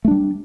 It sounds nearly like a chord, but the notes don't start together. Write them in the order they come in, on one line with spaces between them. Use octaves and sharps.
A3 D4 G3